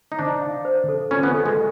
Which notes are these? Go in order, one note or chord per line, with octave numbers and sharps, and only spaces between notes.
D#4
D4 C5
F5
C5
A4
C#4 F4
B3
A4
G#3